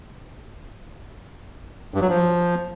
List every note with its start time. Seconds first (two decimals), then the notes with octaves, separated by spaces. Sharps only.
1.94 G2
2.02 F#3
2.09 F3